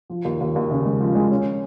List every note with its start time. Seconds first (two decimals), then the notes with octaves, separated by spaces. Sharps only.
0.10 F3
0.25 D#2
0.41 D#2
0.56 D#2
0.71 C#3
0.86 G#3
1.00 F3
1.15 G#3
1.31 C#4